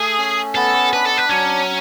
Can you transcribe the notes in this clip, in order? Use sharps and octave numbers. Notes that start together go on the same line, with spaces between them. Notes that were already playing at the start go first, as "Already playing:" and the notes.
Already playing: A3 G#4
C#4
B3 A4
D4 B4
A4
B4
F#3 C#4